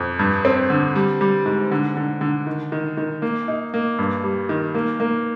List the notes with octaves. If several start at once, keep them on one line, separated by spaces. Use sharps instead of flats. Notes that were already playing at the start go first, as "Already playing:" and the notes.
Already playing: F2
G2
C4
D3
G3
G3
G#2
D3
D3
D3
D#3
D#3
D#3
A#3
D#4
A#3
G2
G3
D#3
A#3
A#3